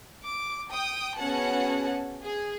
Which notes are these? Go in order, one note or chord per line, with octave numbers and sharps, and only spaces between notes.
D6
G5 D#6
B3 C#4 F#4 G#4 F#5 A5
G#4